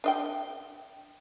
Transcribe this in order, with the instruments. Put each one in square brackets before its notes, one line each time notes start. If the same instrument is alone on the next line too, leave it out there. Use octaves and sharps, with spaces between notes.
[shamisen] D4 D#5 G5